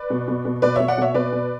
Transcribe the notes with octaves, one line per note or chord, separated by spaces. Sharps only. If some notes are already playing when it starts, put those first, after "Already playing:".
Already playing: B4 D5
B2
B2
B2
B2 B4 D5
B2 C#5 E5
D5 F#5
B2 C#5 E5
B2 B4 D5
B2